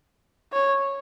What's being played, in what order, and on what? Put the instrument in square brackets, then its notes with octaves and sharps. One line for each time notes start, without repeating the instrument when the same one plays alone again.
[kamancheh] C#5